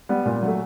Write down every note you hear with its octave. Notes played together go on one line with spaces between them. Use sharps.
G3 B3
A#2
F#3 A3